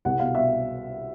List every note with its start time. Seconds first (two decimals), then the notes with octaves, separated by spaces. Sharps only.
0.05 C2 F#5
0.20 B2 F5
0.35 B2 E5